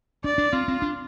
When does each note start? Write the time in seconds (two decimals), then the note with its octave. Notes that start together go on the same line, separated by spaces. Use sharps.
0.24 D4 D5
0.38 D4
0.53 C4 F4
0.68 C4
0.82 D4